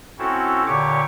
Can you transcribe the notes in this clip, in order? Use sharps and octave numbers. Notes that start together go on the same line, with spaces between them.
C4 C#4 E4 F#4 A4
A#2 D3 G4 C#5 C#6 D6